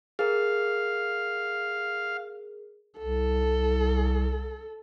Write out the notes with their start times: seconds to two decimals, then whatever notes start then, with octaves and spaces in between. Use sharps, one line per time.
0.19 G#4 A#4 F5
2.99 C2 A4